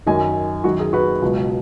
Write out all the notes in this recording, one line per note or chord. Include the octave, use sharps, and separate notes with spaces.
F#2 D#3 F#3 D#5 G#5
F#2 D#3 F#3 F#4
G#4
F#4 B4
C#2 B2 F#3